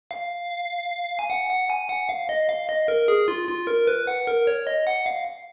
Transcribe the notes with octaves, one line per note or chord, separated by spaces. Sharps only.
F5
G#5
F#5
F#5
G#5
F#5
F5
D#5
F5
D#5
A#4
G#4
F4
F4
A#4
B4
F#5
A#4
C#5
D#5
F#5
F5